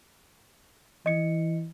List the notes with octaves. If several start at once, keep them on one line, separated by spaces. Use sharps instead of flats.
E3 D#5 C#7